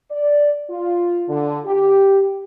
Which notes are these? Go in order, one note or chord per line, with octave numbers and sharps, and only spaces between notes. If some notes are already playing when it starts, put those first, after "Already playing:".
D5
F4
D3
G4